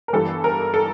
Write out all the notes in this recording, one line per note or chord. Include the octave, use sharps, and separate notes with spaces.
A#4
G1 G2 E3 G3 A4
A#4
A4